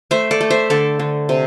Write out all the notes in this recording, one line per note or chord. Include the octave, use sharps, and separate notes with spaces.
A3 C5 E5
A4 D5
A3
C5 E5
D3 A4 D5
D3
C3